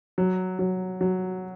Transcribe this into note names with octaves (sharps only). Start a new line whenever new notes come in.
F#3
F#3
F#3